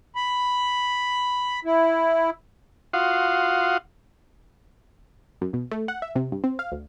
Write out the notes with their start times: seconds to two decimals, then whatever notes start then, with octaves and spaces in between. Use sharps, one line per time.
0.16 B5
1.65 E4
2.93 F4 F#4 F5 F#5 C6 D#6
5.41 F#2
5.53 B2
5.71 A3
5.88 F#5
6.02 E5
6.15 C3
6.32 G2
6.44 C4
6.59 F5
6.72 D2